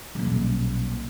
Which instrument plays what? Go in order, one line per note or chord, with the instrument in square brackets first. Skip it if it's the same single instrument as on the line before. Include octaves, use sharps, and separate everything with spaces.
[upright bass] D#1 B1